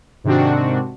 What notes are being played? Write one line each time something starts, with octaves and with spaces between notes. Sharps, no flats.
G#2 C3 D#3 C4 D4 F#4